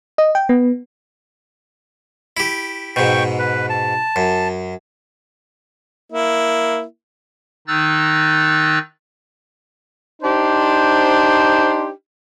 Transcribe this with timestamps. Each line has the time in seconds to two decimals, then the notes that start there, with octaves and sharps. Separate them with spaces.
0.18 D#5
0.35 G5
0.49 B3
2.37 E4 G4
2.96 G#2 B2 G5 C#6
3.39 B4
3.70 A5
4.16 F#2
6.12 A#3 E4
7.68 D#3 D#4 E6 F#6 A6
10.23 D4 D#4 G4 C5